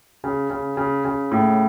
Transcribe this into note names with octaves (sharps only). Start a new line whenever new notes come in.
C#3
C#3
C#3
C#3
A2